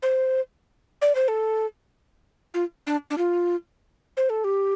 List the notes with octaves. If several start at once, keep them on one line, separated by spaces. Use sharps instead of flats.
C5
D5
C5
A4
F4
D4
D4
F4
C5
A4
G4